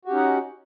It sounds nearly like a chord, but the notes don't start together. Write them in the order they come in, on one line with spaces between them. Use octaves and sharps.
F#4 G4 C#4 D#4 F#5